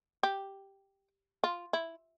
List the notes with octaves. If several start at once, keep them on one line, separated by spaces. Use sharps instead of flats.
G4
F4
E4